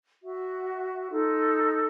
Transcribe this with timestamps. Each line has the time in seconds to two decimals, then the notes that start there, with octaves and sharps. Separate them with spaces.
0.23 F#4 E5
1.11 D#4 F4 A4